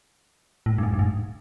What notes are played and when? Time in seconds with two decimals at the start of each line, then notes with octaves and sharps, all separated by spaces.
0.66 A2
0.78 G2
0.83 G#2
0.94 G2
0.99 G#2